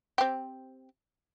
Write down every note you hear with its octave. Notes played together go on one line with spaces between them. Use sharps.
C4 G4